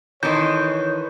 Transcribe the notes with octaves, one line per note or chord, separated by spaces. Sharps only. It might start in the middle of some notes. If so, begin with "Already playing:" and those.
D#3 E3 A4 C#5 D#5 C6 G6